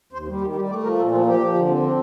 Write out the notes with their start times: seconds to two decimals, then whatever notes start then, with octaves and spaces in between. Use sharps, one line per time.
0.13 D#2 C5
0.28 G3
0.41 D#3 G4
0.55 G3 G4
0.69 A3 D5
0.83 F3 A#4
0.98 A#2 A4
1.11 F3 F4
1.26 F3 G4
1.40 F3
1.54 D3
1.68 C4
1.83 D4